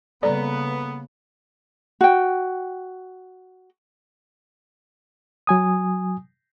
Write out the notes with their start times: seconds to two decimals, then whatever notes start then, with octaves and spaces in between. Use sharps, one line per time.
0.23 C#3 G3 A#3 B3 A4 D5 A#5
2.01 F#4 G5
5.47 F#3 G#5 D#6